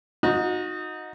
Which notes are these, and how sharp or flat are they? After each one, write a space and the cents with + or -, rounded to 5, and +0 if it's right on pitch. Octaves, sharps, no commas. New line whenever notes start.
D#4 +0 F#4 -30